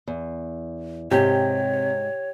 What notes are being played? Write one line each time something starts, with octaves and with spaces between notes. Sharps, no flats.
E2
G#2 C3 G4 C#5